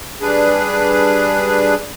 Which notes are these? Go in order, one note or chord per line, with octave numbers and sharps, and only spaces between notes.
G3 D4 G#4 B4